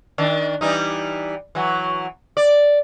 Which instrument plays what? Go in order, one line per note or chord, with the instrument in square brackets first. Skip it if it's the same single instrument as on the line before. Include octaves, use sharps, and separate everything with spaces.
[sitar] D#3 D4
E3 G3 D#4
E3 F#3
D5